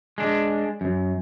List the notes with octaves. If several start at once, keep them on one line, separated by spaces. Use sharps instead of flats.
G#3 D4
F#2